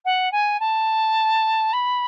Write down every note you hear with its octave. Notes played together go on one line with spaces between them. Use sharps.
F#5
G#5
A5
B5